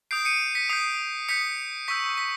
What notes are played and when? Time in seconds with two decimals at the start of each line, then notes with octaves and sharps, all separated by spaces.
0.11 D#6 G6 C7 D7
0.25 C#7 D#7
0.55 B6 C#7
0.69 D#6 G6 C7
1.28 D#6 G6 B6 C#7
1.88 C#6 E6 G6 B6
2.18 B6